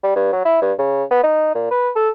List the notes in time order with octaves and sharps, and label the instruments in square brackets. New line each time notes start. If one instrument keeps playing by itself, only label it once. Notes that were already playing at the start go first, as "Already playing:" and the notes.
[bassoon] G3
G2
F#3
E4
G2
C#3
B3
D#4
A#2
B4
A4